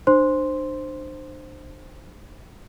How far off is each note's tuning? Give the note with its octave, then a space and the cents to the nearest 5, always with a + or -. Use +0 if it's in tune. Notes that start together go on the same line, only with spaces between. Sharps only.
D4 +40 C5 +0 C6 +0